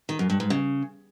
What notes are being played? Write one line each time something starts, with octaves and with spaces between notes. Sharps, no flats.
D#3
F#2
G2
G#2
C#3